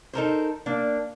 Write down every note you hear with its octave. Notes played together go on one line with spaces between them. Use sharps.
D#4 A4 A#4 C5
A#3 D4